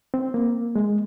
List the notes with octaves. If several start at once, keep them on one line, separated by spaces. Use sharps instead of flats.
C4
A#3
G#3